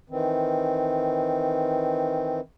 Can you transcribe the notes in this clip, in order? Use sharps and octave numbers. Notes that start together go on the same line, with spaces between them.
D#3 E3 C4